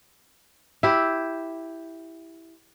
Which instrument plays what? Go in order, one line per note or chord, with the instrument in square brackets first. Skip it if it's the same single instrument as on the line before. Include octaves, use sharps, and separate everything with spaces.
[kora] E4 G4